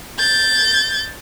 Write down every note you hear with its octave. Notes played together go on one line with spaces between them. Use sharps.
G6 A6